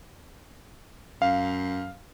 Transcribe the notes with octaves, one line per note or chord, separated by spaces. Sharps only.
F#2 F5